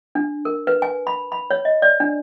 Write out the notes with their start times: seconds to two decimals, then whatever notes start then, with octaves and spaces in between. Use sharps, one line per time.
0.15 D4
0.45 A#4
0.67 B4
0.82 G#5
1.07 B5
1.32 B5
1.50 C#5
1.65 D#5
1.82 D5
2.00 D4